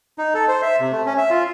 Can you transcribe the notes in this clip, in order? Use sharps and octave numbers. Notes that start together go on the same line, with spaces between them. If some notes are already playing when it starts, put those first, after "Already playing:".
D#4
A4
C5
E5
C3
A3
C#4
E5
F4